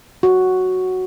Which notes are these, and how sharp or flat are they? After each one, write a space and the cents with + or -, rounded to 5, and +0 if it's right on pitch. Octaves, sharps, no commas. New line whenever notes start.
F#4 +0